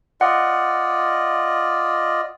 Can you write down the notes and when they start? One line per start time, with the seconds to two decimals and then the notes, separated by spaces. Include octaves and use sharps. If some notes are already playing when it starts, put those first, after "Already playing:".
0.21 F4 D5 D#5 F#5